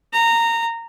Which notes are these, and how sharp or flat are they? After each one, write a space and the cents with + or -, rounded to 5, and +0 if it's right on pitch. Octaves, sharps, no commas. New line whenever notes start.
A#5 -15